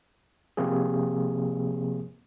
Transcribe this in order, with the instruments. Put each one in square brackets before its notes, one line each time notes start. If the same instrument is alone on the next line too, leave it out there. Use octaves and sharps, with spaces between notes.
[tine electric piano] C3 F3 A#3 C4 G#4